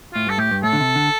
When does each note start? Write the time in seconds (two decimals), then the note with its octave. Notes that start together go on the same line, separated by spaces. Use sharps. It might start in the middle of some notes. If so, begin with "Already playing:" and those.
0.14 A2 F4
0.27 G2 A4
0.38 A2 G4
0.51 G2
0.63 A2 A4
0.73 D3
0.80 C3
0.96 D3